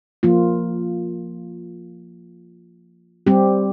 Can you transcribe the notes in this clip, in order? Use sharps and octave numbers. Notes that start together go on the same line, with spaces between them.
F3 A#3 F4
G3 C4 G4